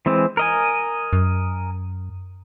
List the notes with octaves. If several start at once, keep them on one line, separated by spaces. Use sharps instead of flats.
E3 G#3 C4
A#4 D#5 G#5
F#2